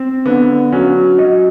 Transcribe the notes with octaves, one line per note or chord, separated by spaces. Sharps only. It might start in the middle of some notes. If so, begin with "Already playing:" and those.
Already playing: C4
D3 B3
F#3 C#4
F#2 D#4